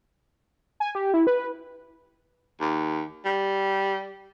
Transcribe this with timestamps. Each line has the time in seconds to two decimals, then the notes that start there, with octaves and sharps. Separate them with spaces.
0.80 G#5
0.95 G4
1.14 E4
1.27 B4
2.61 D#2
3.25 G3